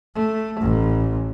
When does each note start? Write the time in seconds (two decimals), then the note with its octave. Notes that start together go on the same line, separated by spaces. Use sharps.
0.15 A3
0.60 A1